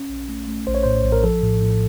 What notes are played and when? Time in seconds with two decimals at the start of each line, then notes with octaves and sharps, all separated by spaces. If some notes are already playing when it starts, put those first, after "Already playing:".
Already playing: C#4
0.09 A#1
0.29 A3
0.48 A3
0.67 A#1 C5
0.75 C#5
0.83 A2 C5
1.05 A#1
1.12 A#4
1.24 F3 A4
1.43 A2
1.62 A2